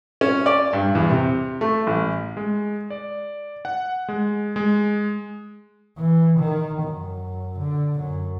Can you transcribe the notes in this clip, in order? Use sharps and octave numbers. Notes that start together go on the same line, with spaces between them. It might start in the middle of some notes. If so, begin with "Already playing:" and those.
C#4
D5
G2
E2
C3
A3
A1
G#3
D5
F#5
G#3
G#3
E3
D#3
F#2
D3
F#2